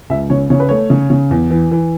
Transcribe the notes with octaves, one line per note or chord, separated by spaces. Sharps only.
C#2 E5
C#3 C#5
C#3 C#5
B4
A3 C#5
C#3
C#3
E2
E3
E3